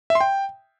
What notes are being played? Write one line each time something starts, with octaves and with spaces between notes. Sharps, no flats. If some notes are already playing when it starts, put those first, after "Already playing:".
E5
C6
G5